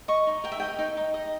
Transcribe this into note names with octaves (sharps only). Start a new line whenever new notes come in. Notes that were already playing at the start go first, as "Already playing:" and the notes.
D#5 C#6
D#4
A#4 G5
E5
D#5 G5
D#4
D#4
D#5